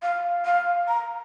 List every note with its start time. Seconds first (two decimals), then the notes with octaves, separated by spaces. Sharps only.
0.02 F5
0.45 F5
0.88 A#5